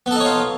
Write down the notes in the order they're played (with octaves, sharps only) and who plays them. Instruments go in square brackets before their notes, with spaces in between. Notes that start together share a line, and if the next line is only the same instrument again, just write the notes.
[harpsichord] B3
A4
D#4
C#5
F4